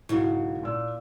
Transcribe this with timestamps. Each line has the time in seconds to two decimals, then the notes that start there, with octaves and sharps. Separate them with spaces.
0.09 B1 G#2 C#3 E4 F#4
0.63 A#2 E6